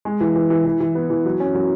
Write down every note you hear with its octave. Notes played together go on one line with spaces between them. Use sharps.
G#3
E3
E3
E3
E3
E3
B3
E3
F#3
C#4
F#3